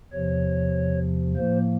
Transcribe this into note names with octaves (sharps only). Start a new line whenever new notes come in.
E2 C3 F3 C#5
A2 F3 A#3 C5